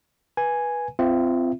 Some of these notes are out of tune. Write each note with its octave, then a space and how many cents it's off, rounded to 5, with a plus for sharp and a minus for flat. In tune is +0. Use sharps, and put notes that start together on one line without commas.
B4 -15 G#5 +0
C4 -20 F4 -25 E5 +0